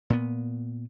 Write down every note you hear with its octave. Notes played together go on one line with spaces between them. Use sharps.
A#2 B3